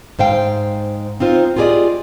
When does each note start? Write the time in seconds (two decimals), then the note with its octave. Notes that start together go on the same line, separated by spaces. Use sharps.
0.19 G#2 C5 F5 G5
1.20 C4 D#4 F4 C5
1.57 F4 G4 G#4 A#4 D5 D#5